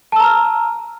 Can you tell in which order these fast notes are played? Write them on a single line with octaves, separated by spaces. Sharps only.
A5 E6 A#5 F6